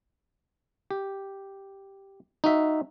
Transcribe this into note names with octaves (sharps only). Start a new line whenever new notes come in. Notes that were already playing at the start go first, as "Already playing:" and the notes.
G4
D#4 F#4 E5